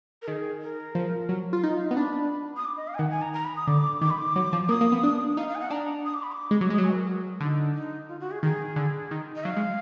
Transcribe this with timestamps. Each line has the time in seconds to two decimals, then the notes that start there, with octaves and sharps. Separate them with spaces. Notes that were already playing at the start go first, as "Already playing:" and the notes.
0.22 A#4
0.28 D#3 G#4
0.62 A#4
0.95 F3
1.29 F#3
1.53 F4
1.64 D#4
1.75 F5
1.86 D#5
1.91 B3
1.97 D4 B5
2.57 D#6
2.65 D6
2.77 D#5
2.88 F5
2.95 G#5
2.99 D#3 F#5
3.11 G#5
3.22 A#5
3.33 A#5
3.45 B5
3.56 D#6
3.67 D3 D6
4.01 D#3 D6
4.10 B5
4.20 D6
4.36 F#3
4.53 F3
4.69 A#3 D#6
4.81 A#3
4.92 B3
5.03 D4
5.37 D#4 F5
5.48 F5
5.55 G#5
5.60 F#5
5.70 D4 A#5
6.05 D#6
6.14 D6
6.23 B5
6.32 D6
6.51 G#3
6.61 F#3
6.70 G#3 D#6
6.78 F#3
6.84 G#5
6.91 B4
6.96 A#4
7.07 F#4
7.40 D3 D#4
7.75 D#4
8.09 F4
8.20 F#4
8.31 G#4
8.43 D#3 G#4
8.76 D3
9.11 D#3
9.36 D#5
9.44 F#3 F5
9.56 G#3